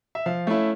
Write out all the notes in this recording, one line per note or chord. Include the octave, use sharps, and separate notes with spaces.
E5
F3 F5
A3 C#4 E4